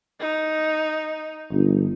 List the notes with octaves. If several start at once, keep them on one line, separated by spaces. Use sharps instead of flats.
D#4
G1